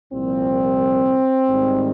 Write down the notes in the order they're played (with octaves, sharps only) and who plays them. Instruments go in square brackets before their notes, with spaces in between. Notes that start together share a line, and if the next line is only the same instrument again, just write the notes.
[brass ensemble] C2 A#2 F3 C4
G#2 D#3 G3